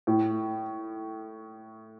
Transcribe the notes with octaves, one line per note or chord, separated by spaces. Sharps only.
A2